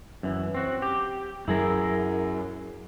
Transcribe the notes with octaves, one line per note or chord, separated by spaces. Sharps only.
F#2 E3
C4 F#4
G4
F#2 F#3 E4 G#4 A#4